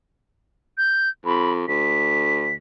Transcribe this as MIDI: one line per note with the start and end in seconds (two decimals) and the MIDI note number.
0.78 1.09 91
1.26 1.66 41
1.26 1.52 83
1.68 2.58 38
1.68 2.55 95